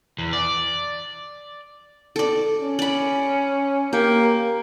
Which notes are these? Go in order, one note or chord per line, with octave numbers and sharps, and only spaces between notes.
E2
D5
A4 D5
C#4
D5 B5
A#3 G4